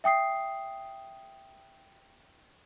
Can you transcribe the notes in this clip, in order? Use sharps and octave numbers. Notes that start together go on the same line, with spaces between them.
E5 G5 D#6 C7